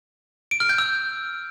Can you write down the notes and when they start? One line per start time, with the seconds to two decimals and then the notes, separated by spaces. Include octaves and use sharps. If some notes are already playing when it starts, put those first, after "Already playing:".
0.51 D7
0.60 F6
0.69 G6
0.78 E6